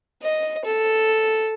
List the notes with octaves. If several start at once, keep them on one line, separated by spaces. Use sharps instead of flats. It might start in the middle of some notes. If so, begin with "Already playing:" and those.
D#5
A4